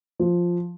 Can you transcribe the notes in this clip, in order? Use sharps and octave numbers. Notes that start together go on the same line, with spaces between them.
F3